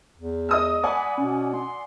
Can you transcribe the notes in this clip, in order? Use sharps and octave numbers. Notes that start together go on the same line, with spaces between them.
E2
D#5 D#6 E6
D5 F#5 G#5 B5
B2 C#4
C6